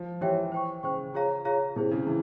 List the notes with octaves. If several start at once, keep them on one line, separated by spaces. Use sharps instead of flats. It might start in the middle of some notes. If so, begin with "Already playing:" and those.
Already playing: F3
E3 E4 G4 C#5 E5 G5
C5 G5 C#6
C#3 C5 G5 C#6
F4 G#4 C#5 F5 A#5
F4 G#4 C#5 F5 A#5
C3 E4 G#4 C5
C#3
E3 E4